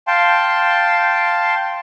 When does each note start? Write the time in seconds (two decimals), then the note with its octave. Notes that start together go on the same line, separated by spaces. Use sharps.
0.07 F5 G5 A5 C6